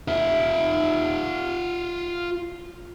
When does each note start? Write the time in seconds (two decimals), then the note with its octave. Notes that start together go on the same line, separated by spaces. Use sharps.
0.08 F4 E5